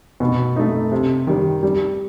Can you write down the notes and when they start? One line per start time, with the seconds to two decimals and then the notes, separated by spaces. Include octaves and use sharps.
0.20 B2
0.56 A3 D#4
0.92 C3
1.27 D#3 G3
1.63 G3